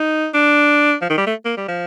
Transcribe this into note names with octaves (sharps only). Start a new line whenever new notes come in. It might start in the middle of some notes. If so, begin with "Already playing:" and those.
Already playing: D#4
D4
F3
D#3
G3
A3
A#3
G3
F3